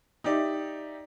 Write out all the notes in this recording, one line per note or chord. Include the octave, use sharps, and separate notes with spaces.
D#4 G4 D5 E5